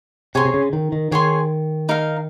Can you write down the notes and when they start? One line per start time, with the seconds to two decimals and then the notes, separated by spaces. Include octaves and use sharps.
0.35 C3 G#4 C#5 G#5 C6
0.45 C3
0.54 C#3
0.73 D#3
0.92 D#3
1.11 D#3 G#4 C#5 G#5 C6
1.89 D#4 A#4 F5